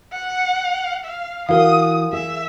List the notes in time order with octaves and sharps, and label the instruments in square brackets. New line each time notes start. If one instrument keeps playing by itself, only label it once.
[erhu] F#5
F5
[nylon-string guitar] E3 E4 F#4 [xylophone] A#4 F5 [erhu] D#6
[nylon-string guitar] G#4 [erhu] E5